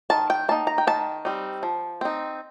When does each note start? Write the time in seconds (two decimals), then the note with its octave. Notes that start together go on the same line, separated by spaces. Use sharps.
0.10 D#3 A5
0.30 G5
0.48 A#3 D#4 A5
0.67 A#5
0.78 G5
0.87 D#3 A5
1.25 G3 C4 D#4
1.63 F3
2.01 C4 D#4